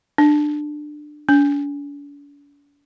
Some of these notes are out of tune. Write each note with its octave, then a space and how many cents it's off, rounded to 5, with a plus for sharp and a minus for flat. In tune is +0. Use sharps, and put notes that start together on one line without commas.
D4 +20
D4 -45